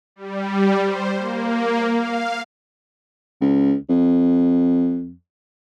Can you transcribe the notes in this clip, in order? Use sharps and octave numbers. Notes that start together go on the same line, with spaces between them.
G3
C5
A#3
F5
C#2
F2